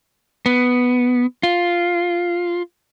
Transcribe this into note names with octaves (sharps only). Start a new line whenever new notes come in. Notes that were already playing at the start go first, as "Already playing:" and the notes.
B3
F4